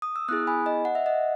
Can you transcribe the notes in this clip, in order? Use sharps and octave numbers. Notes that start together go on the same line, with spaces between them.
D#6
E6
B3 E4 G#4 D#6 F#6
G#5 B5
D#5
F#5
E5
D#5 F#5